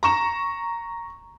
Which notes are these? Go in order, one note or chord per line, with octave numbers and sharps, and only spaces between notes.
A#5 C#6 E7